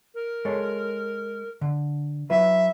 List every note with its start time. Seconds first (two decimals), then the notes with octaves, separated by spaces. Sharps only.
0.15 A#4
0.45 G#3 A4 C#5
1.61 D3
2.30 F#3 E4 B4 E5